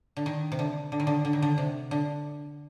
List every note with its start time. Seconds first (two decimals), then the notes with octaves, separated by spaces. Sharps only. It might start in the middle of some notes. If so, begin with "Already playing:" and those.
0.17 D3
0.26 D#3
0.52 C3
0.59 D3
0.92 D3
1.00 D#3
1.07 D3
1.25 D3
1.33 D#3
1.42 D3
1.58 C3
1.91 D3